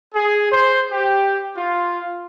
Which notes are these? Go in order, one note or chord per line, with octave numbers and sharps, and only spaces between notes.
G#4
C5
G4
F4